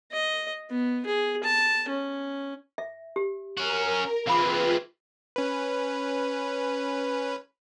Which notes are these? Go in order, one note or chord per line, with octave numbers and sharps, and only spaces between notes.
D#5
B3
G#4
A5
C#4
E5
G4
C#4 F#4 A#4
E3 C4 F4 G#4 B4 F5 B5 D6
C#4 B4